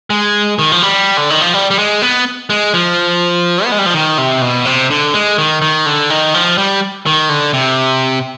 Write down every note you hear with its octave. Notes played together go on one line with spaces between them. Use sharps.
G#3
D#3
F3
G3
D3
D#3
F3
G3
G3
G#3
B3
G#3
F3
B3
G#3
G3
F3
D#3
C3
B2
C3
D3
G#3
D#3
D#3
D3
D#3
F3
G3
D#3
D3
C3